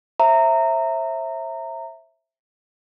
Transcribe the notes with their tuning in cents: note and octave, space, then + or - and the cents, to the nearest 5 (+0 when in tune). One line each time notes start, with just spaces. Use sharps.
C5 +40 E5 +0 A#5 -20